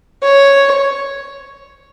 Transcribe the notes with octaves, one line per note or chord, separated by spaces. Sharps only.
C#5